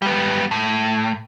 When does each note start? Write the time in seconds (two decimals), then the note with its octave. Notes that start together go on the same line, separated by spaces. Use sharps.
0.02 G3 B3
0.51 A2